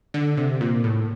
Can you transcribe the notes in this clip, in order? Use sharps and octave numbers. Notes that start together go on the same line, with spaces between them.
D3
C3
A#2
A2